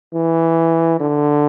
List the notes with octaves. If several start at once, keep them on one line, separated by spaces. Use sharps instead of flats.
E3
D3